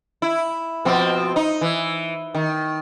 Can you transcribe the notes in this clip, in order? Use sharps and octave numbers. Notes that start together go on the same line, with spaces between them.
E4
B2 F3 C4
D#4
E3
D#3